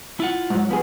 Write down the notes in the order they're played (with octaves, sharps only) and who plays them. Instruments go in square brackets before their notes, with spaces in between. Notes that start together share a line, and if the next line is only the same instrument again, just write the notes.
[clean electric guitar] E4 F4 F#5
[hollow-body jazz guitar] G#2 F#3
F3 B3 G#4